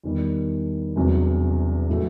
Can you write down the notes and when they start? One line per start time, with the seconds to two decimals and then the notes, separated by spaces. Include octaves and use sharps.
0.03 E2 D#3 G3
0.96 E1 E2 C3 F#3
1.90 A2 F#3 A3